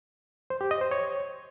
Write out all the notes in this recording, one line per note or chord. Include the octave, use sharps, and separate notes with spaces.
C5
G4
D#5
C5
C#5